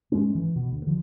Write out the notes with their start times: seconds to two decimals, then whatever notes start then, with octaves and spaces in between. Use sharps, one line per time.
0.12 G#2 G#3 A3 C#4
0.35 E3
0.56 B2
0.71 D2
0.87 D3 F3